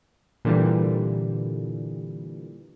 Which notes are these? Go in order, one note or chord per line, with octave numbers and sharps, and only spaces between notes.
A#2 D3 E3 G3